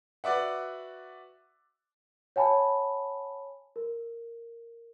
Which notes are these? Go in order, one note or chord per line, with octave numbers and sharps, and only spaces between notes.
F#4 B4 D5 E5 F#5
C#5 F#5 G#5 A5 B5
A#4